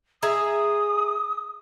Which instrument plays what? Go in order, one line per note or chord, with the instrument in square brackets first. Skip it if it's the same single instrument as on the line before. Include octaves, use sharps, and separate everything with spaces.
[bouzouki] G#4 E5 A#5 [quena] D#6